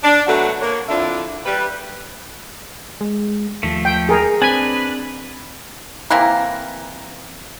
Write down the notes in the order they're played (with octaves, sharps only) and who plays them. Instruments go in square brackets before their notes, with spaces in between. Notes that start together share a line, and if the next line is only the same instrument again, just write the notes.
[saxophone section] D4
B2 F#3 A3 F#4 F#5
A#3 C#5
F2 D3 D4 E4 F4 E5
G3 B4
[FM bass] G#3
[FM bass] D#2 [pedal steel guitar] F3 A3
[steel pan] G5
G#4 A#4
[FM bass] C4 [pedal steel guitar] D4 B4 [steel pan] G#5
[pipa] C3 E3 A#3 A#4